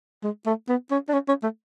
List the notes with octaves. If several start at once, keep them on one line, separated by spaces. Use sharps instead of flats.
G#3
A3
B3
C#4
D4
C#4
C#4
A3